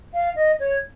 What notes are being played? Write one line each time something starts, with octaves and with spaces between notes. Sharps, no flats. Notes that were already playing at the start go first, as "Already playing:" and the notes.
F5
D#5
C#5